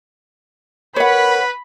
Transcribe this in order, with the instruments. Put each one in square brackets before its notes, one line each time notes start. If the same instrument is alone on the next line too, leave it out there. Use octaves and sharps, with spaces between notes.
[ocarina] A#4 [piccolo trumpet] B4 [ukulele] C#5 F#5 [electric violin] B5